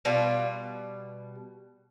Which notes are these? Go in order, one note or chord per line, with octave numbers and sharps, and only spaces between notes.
B2 G3 F4